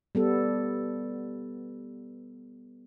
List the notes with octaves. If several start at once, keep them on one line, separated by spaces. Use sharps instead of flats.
G3 B3 A4